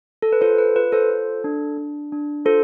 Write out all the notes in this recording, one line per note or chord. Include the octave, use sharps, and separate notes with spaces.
A4
B4
F4 A4 C5
B4
F4 B4
A4 C5
A4
D4
D4
D4
F4 A4 C5